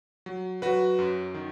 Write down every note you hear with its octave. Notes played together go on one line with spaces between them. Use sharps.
F#3
F#3 F#4 B4
F#2
D#3